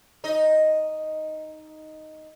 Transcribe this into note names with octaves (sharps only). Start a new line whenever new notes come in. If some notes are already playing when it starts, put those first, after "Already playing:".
D#4 D#5